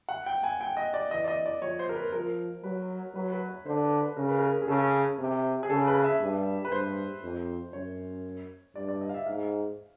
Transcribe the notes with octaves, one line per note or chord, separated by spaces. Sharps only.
F#5
G5
G#5
G5
D#5
D5
E3 D#5
D5
D#5
D5
F3 C#5
C5
A#4
B4
F3 A#4
F#3 B4
F#3 B4
B4
C#5
D3 C5
B4
B4
C#3 A#4
B4
A#4
G#4
C#3 A4
C3
G#4
C#3 A4
B4
E5
G2
B4
G2 C5
F2
F#2 C#5
G2 D5
D5
D#5
F5
E5
G#2 F5